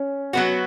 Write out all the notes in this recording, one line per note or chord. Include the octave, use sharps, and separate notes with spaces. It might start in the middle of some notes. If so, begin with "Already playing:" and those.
Already playing: C#4
F#3 B3 F#4